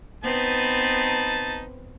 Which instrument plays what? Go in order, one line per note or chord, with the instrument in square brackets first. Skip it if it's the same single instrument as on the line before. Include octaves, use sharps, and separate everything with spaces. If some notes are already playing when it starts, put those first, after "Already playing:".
[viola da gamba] B3 C4 B4 [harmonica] D#4 A5